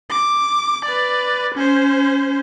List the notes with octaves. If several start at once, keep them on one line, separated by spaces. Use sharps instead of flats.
D6
B4 D5
C#4 C5